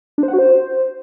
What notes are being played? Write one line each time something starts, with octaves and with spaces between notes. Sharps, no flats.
D4
C5
F#5
F#4
C5